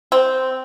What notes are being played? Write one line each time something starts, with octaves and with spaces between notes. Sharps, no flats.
C4